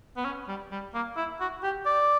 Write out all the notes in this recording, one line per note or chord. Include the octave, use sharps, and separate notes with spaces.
B3
C#4
G3
G3
A#3
E4
F#4
G4
D5